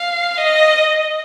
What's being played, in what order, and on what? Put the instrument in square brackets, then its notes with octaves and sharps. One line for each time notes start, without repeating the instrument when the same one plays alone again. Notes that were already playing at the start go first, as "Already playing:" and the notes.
Already playing: [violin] F5
D#5